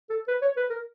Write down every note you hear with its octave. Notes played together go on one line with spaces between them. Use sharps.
A4
B4
C#5
B4
A#4